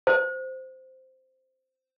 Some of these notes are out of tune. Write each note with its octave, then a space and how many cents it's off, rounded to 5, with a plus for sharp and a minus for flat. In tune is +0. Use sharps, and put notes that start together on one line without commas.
C5 -5